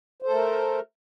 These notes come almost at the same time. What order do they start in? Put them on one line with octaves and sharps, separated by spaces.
C5 A4 A3 A#4